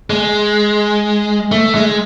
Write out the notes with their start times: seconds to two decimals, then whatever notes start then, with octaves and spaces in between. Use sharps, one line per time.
0.10 G#3
1.52 A3
1.75 G#3